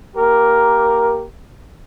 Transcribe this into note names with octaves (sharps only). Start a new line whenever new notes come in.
A#3 G4 A#4